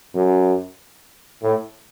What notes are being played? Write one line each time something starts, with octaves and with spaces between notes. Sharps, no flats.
F#2
A2